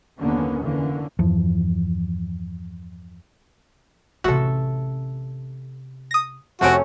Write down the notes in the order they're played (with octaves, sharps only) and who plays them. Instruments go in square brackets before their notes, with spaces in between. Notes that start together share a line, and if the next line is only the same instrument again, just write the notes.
[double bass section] F#1 D#2 D3 A#3 B3 C#4
F1 D3 E3 A#3 C#4
[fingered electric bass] E2 G2 E3 F3
[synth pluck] A1 F#4 [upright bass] C3 C#4 [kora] A4 E5
[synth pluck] D#6 A#6
[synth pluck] F2 C3 D7 [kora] A3 C#4 [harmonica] F#4